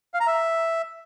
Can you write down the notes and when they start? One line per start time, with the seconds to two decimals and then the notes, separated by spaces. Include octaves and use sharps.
0.14 F5
0.20 A#5
0.27 E5